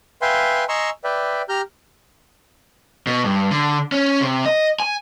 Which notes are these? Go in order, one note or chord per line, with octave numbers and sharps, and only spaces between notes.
B4 E5 F5 G5 G#5 C6
D#5 G#5 A#5 C6 C#6 E6
B4 D5 E5 G5
G4 A#5 F6 G6
B2
G2
D3
C#4
C3
D#5
G#5